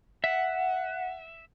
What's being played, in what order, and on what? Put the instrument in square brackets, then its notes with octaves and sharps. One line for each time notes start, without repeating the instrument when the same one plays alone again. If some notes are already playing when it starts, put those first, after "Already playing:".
[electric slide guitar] E5 [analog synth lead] F#5